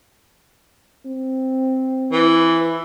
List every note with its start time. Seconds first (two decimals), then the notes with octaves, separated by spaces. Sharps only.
1.06 C4
2.13 E3 E4